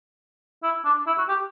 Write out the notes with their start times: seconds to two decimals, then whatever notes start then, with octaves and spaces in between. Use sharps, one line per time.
0.63 E4
0.85 D4
1.07 E4
1.18 F#4
1.28 G4